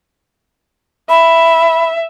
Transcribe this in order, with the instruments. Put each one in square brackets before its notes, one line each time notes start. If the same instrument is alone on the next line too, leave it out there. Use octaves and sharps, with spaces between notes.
[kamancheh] E5 [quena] B5